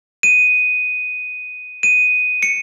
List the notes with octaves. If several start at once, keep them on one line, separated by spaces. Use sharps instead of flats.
D#7
D#7
C#7